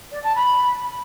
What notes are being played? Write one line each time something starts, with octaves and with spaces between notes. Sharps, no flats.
D5
A5
B5